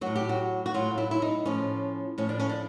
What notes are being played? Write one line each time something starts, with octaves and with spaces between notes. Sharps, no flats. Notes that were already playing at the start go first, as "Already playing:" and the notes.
A2 F#3 F#4
G4
F#4
F#4
A2 F#3 F4
E4
E4
D#4
A2 F3 C#4
A2 F3 C#4
D4
C#4
D4